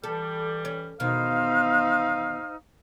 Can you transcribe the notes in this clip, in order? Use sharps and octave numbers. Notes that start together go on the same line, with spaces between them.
E3 G3 A4
C#4
E2 B2 D#3 D#4 C5 F5 F6